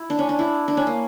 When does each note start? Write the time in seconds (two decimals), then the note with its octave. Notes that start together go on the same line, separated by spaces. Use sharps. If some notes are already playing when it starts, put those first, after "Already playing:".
Already playing: E4
0.10 D4
0.19 C#4
0.29 D4
0.39 E4
0.68 D4
0.77 C#4
0.87 A#3